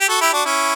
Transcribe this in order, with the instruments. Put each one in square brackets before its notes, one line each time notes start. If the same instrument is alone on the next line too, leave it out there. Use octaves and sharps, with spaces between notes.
[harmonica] G4
F#4 A4
E4 G4
D4 F#4
C#4 E4